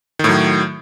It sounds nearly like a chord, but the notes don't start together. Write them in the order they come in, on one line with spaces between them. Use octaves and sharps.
D#3 A2 F#3